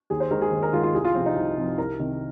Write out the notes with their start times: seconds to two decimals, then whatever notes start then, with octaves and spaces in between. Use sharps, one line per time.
0.10 D#2 G#4
0.20 C5
0.31 D#3 G#3 A#4
0.41 G#4
0.51 D#2
0.63 A#4
0.73 D#3 G#3 F4
0.83 F4
0.94 C2 G#4
1.04 F4
1.15 C3 F3 C4
1.26 D#4
1.36 C2
1.57 C3 F3
1.77 C2 A#4
1.99 C3 D#3